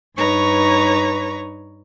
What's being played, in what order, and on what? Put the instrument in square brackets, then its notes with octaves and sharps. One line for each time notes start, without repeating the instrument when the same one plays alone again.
[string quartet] G2 D#4 B4 C#5 A#5 C#6